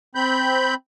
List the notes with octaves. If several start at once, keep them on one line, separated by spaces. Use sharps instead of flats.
C4 B5 G6